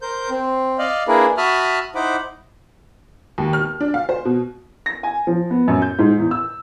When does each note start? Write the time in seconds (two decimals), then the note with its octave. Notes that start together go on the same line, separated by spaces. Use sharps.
0.02 A#4 C5 G6
0.30 C4
0.78 D5 D#5 F5
1.08 A#3 D4 E4 G#4 A#4 B4
1.37 F#4 E5 A5 B5 D#6 F6
1.95 D#4 E4 C5 F#5 B5 D6
3.38 D#2
3.53 F6
3.81 D4
3.94 F5
4.09 C5
4.25 B2
4.86 A#6
5.03 G#5
5.27 F3
5.50 B3
5.68 F#2
5.82 G6
5.99 G#2
6.18 E2
6.31 E6